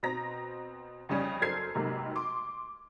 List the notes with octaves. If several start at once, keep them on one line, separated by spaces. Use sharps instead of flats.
B2 C4 A#5 A#6
F2 C#3 G3 C#4
F#2 A4 C5 F6 G#6 C7
F1 B1 G#2 C3 F#3 A#3
C6 D6